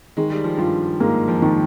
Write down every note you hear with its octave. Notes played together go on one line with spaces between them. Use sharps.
D#3 G#3
G3
F3
G2 G3 F4
G#2 G#3 A#3
F2 F3
D#3